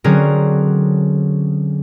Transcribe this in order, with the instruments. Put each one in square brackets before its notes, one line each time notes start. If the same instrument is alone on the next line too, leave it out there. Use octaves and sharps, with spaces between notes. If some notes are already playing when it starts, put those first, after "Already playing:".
[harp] D3 F#3 C4 C#4 G#4 A#4